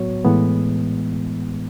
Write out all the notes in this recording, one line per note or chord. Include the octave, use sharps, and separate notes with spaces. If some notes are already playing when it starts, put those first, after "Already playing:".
Already playing: A2 F#3 B3 F#4 C#5
A2 E3 G#3 B3